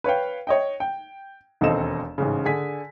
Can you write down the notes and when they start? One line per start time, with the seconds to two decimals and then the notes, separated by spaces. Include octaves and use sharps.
0.04 B4 C#5 F5 G5
0.47 C#5 D#5 G5
0.80 G5
1.61 E1 D#2 C4 A4 D#5 E7
2.18 A1 G#2 C#3
2.45 D3 G#4 G#5 B6